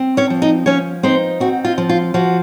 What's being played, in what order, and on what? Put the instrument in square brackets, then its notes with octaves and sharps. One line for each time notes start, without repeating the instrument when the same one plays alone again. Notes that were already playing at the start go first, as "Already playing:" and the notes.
Already playing: [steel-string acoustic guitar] C4
C#4 C#5
F3
D#4 D#5
F3 C#4 C#5
C4 D#4 C5
C4 F#4
F4
F3
F4
F3 F#4